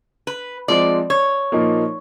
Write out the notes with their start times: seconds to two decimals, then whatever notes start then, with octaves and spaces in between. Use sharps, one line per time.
0.27 B4
0.68 F3 G#3 C4 D5
1.10 C#5
1.52 A#2 F3 A#3 D#4